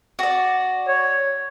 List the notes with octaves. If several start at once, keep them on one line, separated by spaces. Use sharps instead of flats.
F#4 D5
C#5